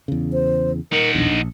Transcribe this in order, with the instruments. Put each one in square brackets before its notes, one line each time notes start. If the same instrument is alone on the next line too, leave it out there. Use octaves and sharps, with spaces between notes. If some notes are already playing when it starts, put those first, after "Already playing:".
[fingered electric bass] E2 C#3
[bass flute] C5
[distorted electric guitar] D#4 F#5 [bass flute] A#4
[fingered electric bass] D#1 B1 E2 [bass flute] D4
[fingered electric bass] A#1